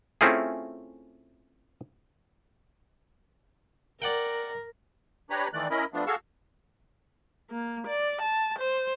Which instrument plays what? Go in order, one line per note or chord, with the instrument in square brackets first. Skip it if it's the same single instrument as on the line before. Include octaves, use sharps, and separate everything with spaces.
[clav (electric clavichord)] A3 C4 C#4 E4 F4 G#4
[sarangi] A#4 [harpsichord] D5 F#5 G5
[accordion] D4 G4 B4 C#5 A#5 B5
D#3 E3 A3 D5 F#6
C#4 E4 A#4 D#5 B5
F3 A3 B3 D4
F#4 G#4 A4 F5 C#6 E6
[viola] A#3
D5
A5
C5